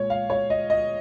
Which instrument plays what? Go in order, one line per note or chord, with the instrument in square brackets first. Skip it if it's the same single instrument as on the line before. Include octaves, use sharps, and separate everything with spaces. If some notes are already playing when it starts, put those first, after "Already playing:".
Already playing: [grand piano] A#2 G#3 C#5
F5
C#5
D#5
D#5